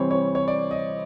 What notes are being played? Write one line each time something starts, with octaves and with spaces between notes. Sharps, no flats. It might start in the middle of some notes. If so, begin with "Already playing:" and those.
Already playing: C3 E3 G3 C4 C5 C#5
C#5
C#5
D5
D#5